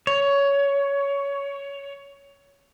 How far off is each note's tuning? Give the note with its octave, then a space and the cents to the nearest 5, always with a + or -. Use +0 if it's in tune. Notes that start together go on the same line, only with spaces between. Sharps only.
C#5 +15